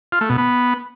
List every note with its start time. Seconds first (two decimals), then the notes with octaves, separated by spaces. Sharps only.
0.12 F4
0.21 A3
0.29 B2
0.38 B3